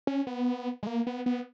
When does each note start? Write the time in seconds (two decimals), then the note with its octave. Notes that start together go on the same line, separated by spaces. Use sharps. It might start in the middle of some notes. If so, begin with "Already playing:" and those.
0.07 C#4
0.27 B3
0.83 G#3
0.87 A#3
1.07 B3
1.26 B3